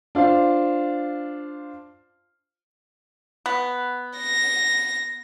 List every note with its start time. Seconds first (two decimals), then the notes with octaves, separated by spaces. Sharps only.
0.15 D4 F4 C5 F5
3.46 B3
4.18 A#6